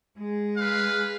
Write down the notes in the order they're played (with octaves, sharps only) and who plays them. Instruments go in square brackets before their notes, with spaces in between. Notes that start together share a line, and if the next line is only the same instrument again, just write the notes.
[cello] G#3 G#4
[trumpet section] B4 F5